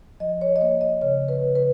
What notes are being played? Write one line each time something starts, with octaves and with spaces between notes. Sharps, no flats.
F3 D#5
C#5
D#5
A#3 C#5
D#5
C#3 C#5
B4
C#3
B4